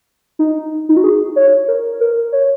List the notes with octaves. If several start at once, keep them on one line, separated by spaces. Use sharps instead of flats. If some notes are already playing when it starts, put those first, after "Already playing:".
D#4
D#4
F#4
G#4
C#5
A#4
A#4
C#5